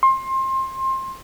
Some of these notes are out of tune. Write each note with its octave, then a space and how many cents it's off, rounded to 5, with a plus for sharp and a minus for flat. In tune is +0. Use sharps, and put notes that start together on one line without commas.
C6 +25